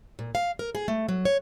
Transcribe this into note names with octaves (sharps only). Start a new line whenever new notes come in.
A#2
F5
A#4
G#4
A3
F#3
C#5